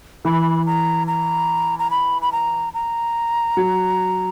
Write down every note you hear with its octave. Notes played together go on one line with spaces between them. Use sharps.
E3 B5
A#5
A#5
A#5
B5
B5
A#5
A#5
F#3